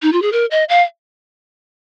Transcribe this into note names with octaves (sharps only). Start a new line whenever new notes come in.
D#4
F4
G#4
A#4
D#5
F5